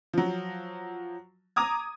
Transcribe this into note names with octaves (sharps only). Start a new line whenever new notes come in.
F3 F#3
A#5 D6 D#6 G#6